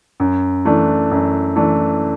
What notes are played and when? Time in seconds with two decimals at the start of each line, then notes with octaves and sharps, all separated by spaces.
0.20 F#2
0.65 E3 A3 D4
1.11 F#2
1.56 E3 A3 D4